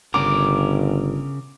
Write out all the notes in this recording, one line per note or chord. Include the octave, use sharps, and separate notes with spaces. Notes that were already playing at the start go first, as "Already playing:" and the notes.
G1 C#3 A#4 D6